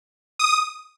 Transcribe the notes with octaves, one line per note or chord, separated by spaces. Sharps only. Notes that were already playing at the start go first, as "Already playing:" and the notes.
D#6